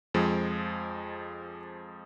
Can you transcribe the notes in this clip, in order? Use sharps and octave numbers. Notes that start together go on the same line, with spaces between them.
F2 F3 G#3